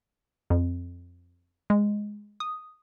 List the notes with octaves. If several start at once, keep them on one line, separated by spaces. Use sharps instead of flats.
F2
G#3
D#6